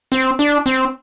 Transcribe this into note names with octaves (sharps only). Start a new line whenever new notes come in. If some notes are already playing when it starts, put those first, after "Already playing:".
C4
D4
C4